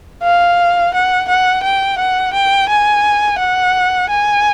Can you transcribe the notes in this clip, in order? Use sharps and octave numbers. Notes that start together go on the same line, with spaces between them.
F5
F#5
F#5
G5
F#5
G5
G#5
F#5
G#5